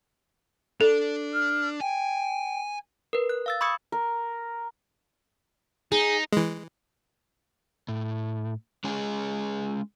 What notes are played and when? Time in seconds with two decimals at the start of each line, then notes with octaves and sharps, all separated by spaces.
0.81 D4 A4
1.33 F6
1.80 G5 G#5
3.13 A#4 B4
3.29 F#6
3.46 F5 E6 A6
3.61 B5 C#6 D#6 E6 G#6 C#7
3.92 A#4
5.92 D#4 G#4
6.33 E3 G#3
7.88 A2
8.84 G#3 C#4 G#4